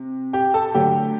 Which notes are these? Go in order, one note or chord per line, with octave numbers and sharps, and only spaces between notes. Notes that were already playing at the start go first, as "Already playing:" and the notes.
Already playing: C3
G4 G5
A4 A5
A5
D3 F#3 A3 G4 G5